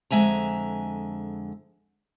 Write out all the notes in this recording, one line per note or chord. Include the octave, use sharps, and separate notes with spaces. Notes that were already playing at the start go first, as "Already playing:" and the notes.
F2 D3 G#3 E5 G#5 A#5